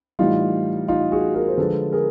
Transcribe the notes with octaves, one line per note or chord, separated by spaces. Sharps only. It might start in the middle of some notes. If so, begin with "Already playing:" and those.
A2 E3 G3 D#4 F4
D#4 F4
F#4 G#4
G#4 A#4
C5
D3 F3 G#3 A4 B4
G#4 A#4